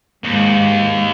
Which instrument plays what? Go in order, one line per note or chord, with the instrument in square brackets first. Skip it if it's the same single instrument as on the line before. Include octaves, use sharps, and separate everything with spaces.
[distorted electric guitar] D#2 [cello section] G#2